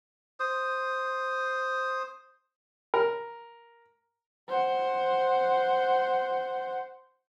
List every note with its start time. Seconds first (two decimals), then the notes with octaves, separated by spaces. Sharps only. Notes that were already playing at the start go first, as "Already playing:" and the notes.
0.40 C5 D#6
2.94 A#4
4.49 C5 F#5